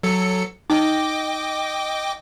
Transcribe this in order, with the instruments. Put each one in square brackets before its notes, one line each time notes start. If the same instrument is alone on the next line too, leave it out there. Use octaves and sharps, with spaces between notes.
[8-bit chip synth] F#3 A4 C#7
[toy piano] D#4 [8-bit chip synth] D#5 G5 D6